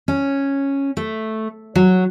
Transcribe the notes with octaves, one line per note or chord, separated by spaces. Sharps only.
C#4
A3
F#3